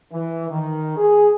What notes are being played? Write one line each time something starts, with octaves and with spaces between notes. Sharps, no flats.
E3
D#3
G#4